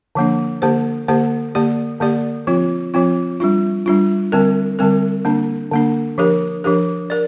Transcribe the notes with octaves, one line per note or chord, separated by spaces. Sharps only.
D3 F3 A#3 D4
D3 A#3 G4 C5
D3 A#3 G4 C5
D3 A#3 G4 D5
D3 A#3 G4 D5
F3 C4 F4
F3 C4 F4
G3 D4 F4
G3 D4 F4
D3 G3 C4 A#4
D3 G3 C4 A#4
D3 A#3 D4
D3 A#3 D4
F3 D4 G4 A#4
F3 D4 G4 A#4
A#4 D5